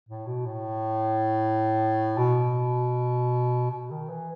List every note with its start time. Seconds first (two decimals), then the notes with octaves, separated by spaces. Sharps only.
0.09 A2
0.27 B2
0.46 A2
2.18 B2
3.71 B2
3.91 D#3
4.09 E3